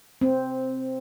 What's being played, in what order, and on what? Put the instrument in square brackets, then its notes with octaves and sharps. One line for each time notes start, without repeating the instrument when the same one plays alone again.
[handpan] C4